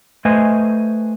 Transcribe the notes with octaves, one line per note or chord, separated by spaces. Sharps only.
A3 B4 C5 D#5 G#5